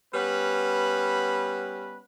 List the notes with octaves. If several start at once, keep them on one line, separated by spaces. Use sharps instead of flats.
G3 B3 C#4 B4